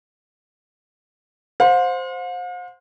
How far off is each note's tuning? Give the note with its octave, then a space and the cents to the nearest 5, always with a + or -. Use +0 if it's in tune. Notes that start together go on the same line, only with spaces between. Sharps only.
C5 +0 F5 +45